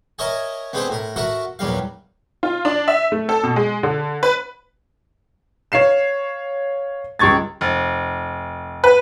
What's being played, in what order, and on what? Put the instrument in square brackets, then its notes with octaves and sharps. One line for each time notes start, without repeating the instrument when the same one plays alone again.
[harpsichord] A#4 C#5 D#5 E5 G#5 A5
B3 C4 D4 G#4 A4 C5
A2 A#4
F#4 A4 A#4 E5 F#5
A#1 E2 F#3 G3 F5
[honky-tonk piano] F4
D4
E5
A3
A4
B2
G#3
D3
B4
[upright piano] C#5 F5 C7 E7
C#2 G3 C#6 G#6 A6
[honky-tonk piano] F1
B4